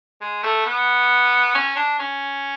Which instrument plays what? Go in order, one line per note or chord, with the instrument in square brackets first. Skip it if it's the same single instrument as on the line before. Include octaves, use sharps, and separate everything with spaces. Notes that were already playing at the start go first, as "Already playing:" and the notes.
[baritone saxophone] G#3
A3
B3
C#4
D4
C#4